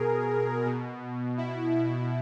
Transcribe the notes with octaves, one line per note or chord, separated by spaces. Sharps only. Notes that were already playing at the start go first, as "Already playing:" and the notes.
Already playing: B2 G#4 A#4
B2
E4
E4